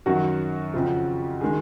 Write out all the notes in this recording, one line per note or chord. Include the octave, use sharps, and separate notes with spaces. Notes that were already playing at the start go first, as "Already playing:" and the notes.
F#2 D#3 F#3 F#4
F2 C#3 F3
D#3 G#3 G#4